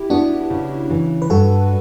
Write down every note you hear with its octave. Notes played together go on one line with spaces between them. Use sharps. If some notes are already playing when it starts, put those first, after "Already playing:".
Already playing: E4 G4
B3 D4 F#4
C#3
E3
B4
G2 F#4 A4